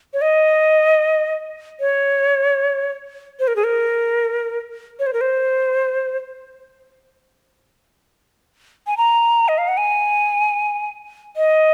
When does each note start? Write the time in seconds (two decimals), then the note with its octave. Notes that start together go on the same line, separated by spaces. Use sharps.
0.13 C#5
0.21 D#5
1.80 C#5
3.39 C5
3.47 A#4
3.56 G#4
3.64 A#4
4.99 C#5
5.06 C5
5.13 A#4
5.21 C5
8.87 G#5
8.97 A#5
9.48 D#5
9.58 F5
9.68 F#5
9.77 G#5
11.36 D#5